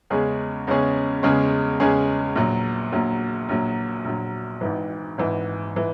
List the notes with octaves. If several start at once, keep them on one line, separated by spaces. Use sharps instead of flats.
E2 C#3 G#3 C#4 G#4
E2 C#3 G#3 C#4 G#4
E2 C#3 G#3 C#4 G#4
E2 C#3 G#3 C#4 G#4
A#1 A#2 F#3
A#1 A#2 F#3
A#1 A#2 F#3
A#1 A#2 F#3
G#1 G#2 E3
G#1 G#2 E3
E3